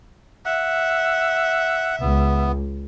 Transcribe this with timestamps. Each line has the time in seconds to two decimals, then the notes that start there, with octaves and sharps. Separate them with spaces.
0.45 E5 F#5
2.01 C#2 B3